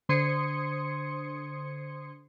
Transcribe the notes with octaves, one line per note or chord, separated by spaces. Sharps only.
D3 C5 C6 D#6 G#6 C#7